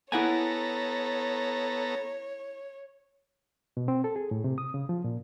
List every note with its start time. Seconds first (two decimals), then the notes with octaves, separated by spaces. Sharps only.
0.12 B3 E4 A4 C#5 F#5 G#5 A#5
3.77 B2
3.88 C4
4.04 A4
4.16 G#4
4.31 A2
4.44 C3
4.58 D#6
4.74 C#3
4.89 F3
5.04 A#2